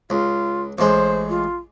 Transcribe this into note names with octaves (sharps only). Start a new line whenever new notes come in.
C#2 F4
A1 G#3 C5
F4